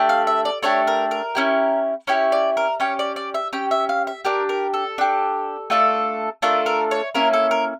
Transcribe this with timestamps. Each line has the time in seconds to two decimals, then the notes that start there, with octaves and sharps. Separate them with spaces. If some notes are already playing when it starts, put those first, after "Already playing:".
Already playing: A3 D4 G4
0.09 F5
0.27 E5
0.45 D5
0.63 A3 D4 G4 C#5
0.87 A#4
1.11 A#4
1.35 C#4 E4 G4
2.07 C#4 E4 G4 C#5
2.32 D5
2.57 A#4
2.80 C#4 G4 C#5
2.99 D5
3.16 D5
3.34 E5
3.53 C#4 G4 G5
3.71 E5
3.89 F5
4.07 E5
4.25 D4 G4 A#4
4.49 A#4
4.74 A4
4.98 D4 G4
5.70 A3 D4 F4 A4
6.42 A3 D4 F4 A4 A#4
6.66 A#4
6.91 C#5
7.15 A#3 C#4 E4 A#4
7.33 A4
7.51 A#4